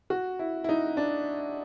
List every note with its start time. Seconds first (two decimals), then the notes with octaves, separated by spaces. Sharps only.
0.10 F#4
0.39 E4
0.64 E4
0.69 D#4
0.97 D4